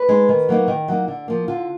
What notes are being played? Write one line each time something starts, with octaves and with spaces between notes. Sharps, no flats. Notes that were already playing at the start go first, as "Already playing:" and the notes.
Already playing: B4
G#3 D#4
D#3
F#3 A#3 D#4
D#3
F#3 A#3 D#4
D3
F3 A#3
D3 F4